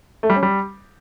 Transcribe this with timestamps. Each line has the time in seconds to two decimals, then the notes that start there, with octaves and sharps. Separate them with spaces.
0.23 A3
0.30 G3
0.36 C#4
0.43 G3